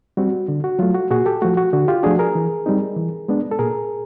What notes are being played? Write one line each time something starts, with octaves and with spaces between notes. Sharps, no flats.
G3 C4 F#4
D3
F#4
F#3 A3 F4
F#4
A#2 F#4 G#4
G4 A4
F3 A3 F#4
F#4
D3 F#4
F4 G4
F3 A3 D4 F#4 G#4
G#4 A#4
E3
G3 C4 D#4
E3
G#3 B3 D4
A4
A#2 G#4 A#4